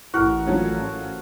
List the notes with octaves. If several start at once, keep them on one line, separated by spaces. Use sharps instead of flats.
A1 E4 F#4 A#4
F3 F#3 C#4